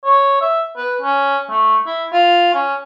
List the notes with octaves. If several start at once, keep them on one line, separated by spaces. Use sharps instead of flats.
C#5
E5
B4
C#4
A3
E4
F4
C#4